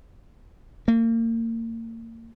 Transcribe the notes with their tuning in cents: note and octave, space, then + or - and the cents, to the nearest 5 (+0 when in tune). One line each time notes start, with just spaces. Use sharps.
A#3 -35